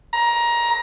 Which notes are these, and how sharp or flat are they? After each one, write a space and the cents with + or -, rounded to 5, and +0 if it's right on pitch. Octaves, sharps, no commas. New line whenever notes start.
A#5 +20